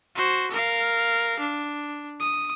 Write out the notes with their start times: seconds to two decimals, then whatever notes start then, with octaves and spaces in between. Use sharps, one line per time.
0.15 F#4 C5
0.52 A#4 F5
1.40 D4
2.20 D#6